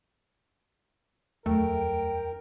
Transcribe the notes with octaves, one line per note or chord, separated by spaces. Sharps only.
D#1 F2 F#3 A3 A#4 G5